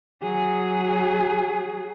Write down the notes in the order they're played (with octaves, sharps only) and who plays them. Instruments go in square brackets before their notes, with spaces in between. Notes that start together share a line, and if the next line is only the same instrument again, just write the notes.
[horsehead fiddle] F#3 G#4